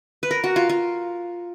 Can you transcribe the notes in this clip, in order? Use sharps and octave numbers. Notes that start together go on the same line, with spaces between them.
B4
A#4
F#4
F4
F4